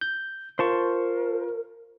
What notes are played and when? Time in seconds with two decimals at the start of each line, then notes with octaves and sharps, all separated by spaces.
0.01 G6
0.59 F4 A#4 C5 A5 C#6